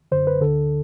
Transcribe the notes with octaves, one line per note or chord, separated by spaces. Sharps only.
F#2 D3 C5
B4
D2 D3 A4